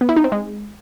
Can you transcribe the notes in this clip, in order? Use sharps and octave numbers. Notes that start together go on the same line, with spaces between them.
B3
E4
D#4
C4
G#3